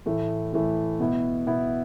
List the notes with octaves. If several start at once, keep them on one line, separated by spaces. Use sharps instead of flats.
A2 E3 A3
A2 E3 A3
B2 B3 E4
B2 B3 E4